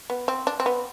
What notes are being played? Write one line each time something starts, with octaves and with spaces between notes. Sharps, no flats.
B3
C4
D4
C4
B3